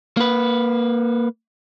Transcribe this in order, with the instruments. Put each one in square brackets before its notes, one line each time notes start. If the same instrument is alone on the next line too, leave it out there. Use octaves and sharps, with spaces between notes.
[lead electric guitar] A#3 B4